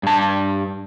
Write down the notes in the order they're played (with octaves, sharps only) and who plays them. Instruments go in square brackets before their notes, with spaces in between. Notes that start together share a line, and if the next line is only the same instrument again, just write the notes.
[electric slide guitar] G2 A5